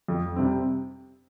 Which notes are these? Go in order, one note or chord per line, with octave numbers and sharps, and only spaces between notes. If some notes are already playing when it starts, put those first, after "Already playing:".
F2
C3 G3 C4